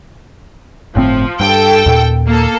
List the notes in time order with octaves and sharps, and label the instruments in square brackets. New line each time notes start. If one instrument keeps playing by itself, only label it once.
[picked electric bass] G1 A2 C4 [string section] F3
[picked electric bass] G2 [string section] A4 G5
[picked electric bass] D#2 A#2
[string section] A#3 A4